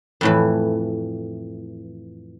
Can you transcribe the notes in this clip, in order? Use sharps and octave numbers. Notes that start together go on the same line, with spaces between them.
F2 A2 E3